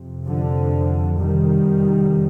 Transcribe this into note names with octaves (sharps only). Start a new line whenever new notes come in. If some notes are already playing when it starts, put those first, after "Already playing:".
Already playing: F2 C3
D3 F3
D#3 G3
F2 C3